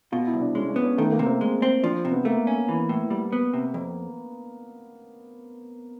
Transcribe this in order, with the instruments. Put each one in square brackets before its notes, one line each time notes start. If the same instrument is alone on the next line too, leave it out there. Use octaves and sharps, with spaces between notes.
[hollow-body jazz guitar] B2 [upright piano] F4
[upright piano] E4
[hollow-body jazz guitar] C2
[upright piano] D4
[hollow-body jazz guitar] G#3 [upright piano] C#4
[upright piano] D4
[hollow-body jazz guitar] B3
[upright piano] C#4
[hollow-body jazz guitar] D#3 [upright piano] A3
[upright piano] A#3
[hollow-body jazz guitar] C3
[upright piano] C4
[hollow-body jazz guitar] G#3
C4
[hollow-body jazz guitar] F3 [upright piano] D4
[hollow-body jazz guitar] C3
[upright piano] B3
[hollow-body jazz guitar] A3 [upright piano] A#3
[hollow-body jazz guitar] C#4
E3
A2
G3
B3
C3
F2